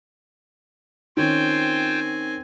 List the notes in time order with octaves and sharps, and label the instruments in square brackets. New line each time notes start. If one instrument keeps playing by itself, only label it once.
[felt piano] D#3 C#4 [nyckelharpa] C4 G#5 [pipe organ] F4 C5 G5